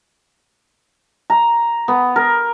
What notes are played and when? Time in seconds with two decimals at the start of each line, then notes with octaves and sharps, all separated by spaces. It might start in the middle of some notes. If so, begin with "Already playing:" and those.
1.30 A#5
1.88 B3
2.16 A#4